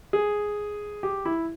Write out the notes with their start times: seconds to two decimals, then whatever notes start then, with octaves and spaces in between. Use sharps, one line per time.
0.13 G#4
1.03 G4
1.25 E4